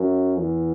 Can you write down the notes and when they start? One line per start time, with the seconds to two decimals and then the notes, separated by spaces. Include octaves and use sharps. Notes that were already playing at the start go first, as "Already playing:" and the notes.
Already playing: F#2
0.39 E2